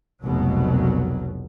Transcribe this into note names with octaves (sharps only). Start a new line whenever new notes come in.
F1 C2 B2 F#3